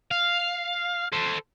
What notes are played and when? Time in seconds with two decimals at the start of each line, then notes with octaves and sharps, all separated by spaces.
0.11 F5
1.12 A4 C5